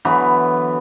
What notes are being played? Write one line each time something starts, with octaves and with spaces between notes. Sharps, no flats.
D3 E3 F#3 B3